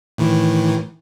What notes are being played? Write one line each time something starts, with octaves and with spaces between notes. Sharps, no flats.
A2 D#3 E3